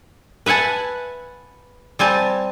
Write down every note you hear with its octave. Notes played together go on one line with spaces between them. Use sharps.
B4 E5 F#5 G#5 A5
G3 C4 G#5 A5